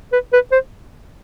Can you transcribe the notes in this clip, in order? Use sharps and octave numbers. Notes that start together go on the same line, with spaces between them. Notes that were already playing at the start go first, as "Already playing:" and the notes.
B4
B4
C5